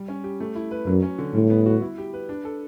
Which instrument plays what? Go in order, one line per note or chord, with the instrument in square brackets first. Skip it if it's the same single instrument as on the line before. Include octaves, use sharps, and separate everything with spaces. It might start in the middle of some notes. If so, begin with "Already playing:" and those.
Already playing: [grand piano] G3
C#4
G4
A3
E4
B4
[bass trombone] F#2 [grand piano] F#3
[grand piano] C#4
D3
[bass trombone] A2 [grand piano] G3
[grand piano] B3
F#4
E4
G4
B4
D4
A4